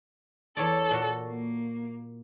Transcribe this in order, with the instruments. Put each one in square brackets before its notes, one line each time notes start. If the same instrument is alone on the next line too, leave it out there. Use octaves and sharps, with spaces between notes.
[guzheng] E2 C#5 D5 [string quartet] A4
[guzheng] A#2 F#4
[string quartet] A#3